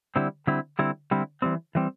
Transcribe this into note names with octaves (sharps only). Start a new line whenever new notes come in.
D3 G3 C4 E4
D3 G3 C4 E4
D3 G3 C4 E4
D3 G3 C4 E4
E3 G3 C4
E3 G3 C4